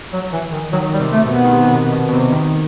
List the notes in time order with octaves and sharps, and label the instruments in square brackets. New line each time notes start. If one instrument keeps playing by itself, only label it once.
[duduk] F#3
E3
D#3
[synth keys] D#3 [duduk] F#3
[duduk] G3
[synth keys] C3
[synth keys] C3 [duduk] A3
[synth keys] B2
[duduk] B3
[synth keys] D#3
C3
B2
B2
B2
C3
D#3